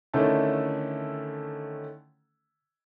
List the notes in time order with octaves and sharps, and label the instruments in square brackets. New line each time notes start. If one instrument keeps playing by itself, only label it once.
[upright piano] D3 D#3 A3 C#4 E4 A4